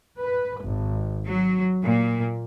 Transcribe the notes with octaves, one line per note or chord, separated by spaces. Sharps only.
B4
G#1
F#3
A#2